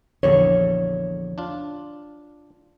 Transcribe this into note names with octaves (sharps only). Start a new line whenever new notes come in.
A#1 E2 D3 C#5
D4 F4